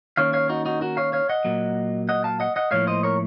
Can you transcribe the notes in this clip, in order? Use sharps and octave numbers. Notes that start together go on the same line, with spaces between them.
D#3 A#3 C#4 C#5 F5
C#5 F5
D#4 F#4
D#4 F#4
F#4 A#4
C#5 F5
C#5 F5
D#5 F#5
A#2 F#3 A#3
D#5 F#5
F5 A5
D#5 F#5
D#5 F#5
A2 F3 A#3 C#5 F5
C5 D#5
A#4 C#5